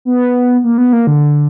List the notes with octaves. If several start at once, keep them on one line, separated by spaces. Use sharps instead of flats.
B3
A#3
B3
A#3
D3